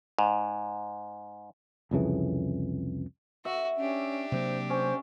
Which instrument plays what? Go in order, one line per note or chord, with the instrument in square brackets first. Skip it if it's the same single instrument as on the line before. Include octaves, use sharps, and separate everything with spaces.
[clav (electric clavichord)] G#2
[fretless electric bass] C2 F2 C#3 E3
[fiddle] F#4 [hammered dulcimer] E5
[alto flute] C#4 [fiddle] D4 G4
[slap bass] C3 F#3 A#3 [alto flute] C5
[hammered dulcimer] C#4 [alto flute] C5